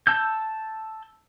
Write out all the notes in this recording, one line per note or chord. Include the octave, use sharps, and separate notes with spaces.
A5 E6 G6